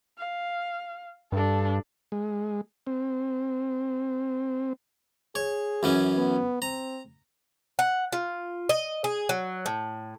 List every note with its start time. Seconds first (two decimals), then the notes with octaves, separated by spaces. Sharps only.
0.18 F5
1.32 G2 D4 A4
2.12 G#3
2.87 C4
5.35 G#4 C#5
5.83 F#2 E3 C#4
6.18 B3
6.62 C4 A#5
7.79 F#5
8.13 F4
8.69 D#5
9.04 G#4
9.29 F#3
9.66 A2